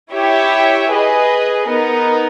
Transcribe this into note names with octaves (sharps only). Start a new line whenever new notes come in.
E4 G4 C#5 E5
G#4 B4 D#5
B3 D#4 A#4